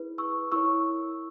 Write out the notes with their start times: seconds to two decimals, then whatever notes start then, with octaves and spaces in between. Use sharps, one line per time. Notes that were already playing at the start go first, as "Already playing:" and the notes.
Already playing: E4 G#4 B4
0.18 C#6 E6
0.52 E4 A#4 C#5 C#6 E6